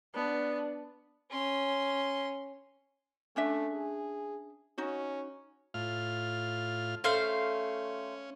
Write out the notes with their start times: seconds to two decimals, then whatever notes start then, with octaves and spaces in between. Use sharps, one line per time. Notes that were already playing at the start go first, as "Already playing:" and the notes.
0.15 B3 D4
1.30 C#4 C6
3.36 A3 C#4 D4 E5
3.73 G#4
4.78 C#4 D#4 F#4
5.74 A2 F4 F6
7.04 A3 C#4 C5 F5